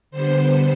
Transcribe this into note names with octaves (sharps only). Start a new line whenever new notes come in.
D3 G3 B3 C5